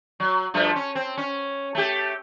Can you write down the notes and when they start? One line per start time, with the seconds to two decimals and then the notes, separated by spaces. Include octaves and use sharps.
0.20 F#3
0.54 G2 F3 A3
0.76 C#4
0.95 C4
1.17 C#4
1.75 A3 G4